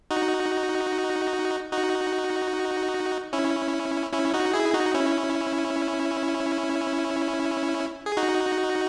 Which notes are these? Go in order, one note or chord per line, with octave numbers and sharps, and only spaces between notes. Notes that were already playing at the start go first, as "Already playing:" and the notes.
D#4 F#4
D#4 F#4
C#4 E4
C#4 E4
D#4 F#4
E4 G#4
D#4 F#4
C#4 E4
G#4
D#4 F#4